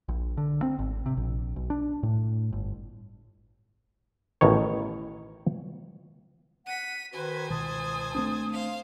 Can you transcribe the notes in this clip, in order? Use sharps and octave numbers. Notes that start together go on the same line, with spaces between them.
A#1
D3
C4
G#1
C3
A#1
B1
D4
A2
G1
A1 B2 D#3 C#5
F#5 B6 D#7
D#3 F#4 B4 C5 G#5
C#2 B2 D#3 A5 D#6
A3 C4 D4
C5 F5